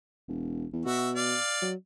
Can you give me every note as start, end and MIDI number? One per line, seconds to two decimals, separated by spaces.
0.28 0.65 28
0.73 0.83 40
0.86 1.35 47
0.86 1.11 66
0.86 1.11 76
1.16 1.68 74
1.16 1.68 77
1.62 1.75 54